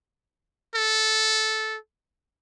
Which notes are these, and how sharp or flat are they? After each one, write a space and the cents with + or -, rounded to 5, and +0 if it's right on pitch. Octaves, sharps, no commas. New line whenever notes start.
A4 -10